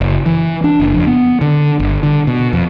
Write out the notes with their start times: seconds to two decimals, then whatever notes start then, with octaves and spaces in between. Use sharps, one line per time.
0.01 F#1
0.26 E3
0.64 D4
0.80 F#1
0.94 F2
1.07 B3
1.41 D3
1.80 G1
2.03 D3
2.27 B2
2.53 F2